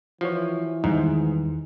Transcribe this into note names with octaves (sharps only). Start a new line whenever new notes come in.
E3 F3 F4 F#4 C#5
E2 G#2 D#3 G3 D#4